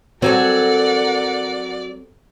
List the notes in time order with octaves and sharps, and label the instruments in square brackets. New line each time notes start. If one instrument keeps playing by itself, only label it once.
[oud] F#3 [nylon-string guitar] C4 F#4 A4 [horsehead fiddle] A#4 F#5 [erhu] D5